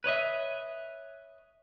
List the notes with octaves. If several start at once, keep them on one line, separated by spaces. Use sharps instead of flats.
B4 C#5 D#5 E5